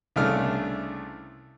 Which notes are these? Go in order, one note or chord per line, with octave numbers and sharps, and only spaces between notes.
C2 C#3 A3 D4 F6